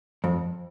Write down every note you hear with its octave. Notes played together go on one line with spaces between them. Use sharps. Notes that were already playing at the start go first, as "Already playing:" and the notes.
F2